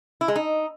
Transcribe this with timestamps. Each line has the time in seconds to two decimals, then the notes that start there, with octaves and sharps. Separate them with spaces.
0.21 E4
0.28 G#3
0.36 D#4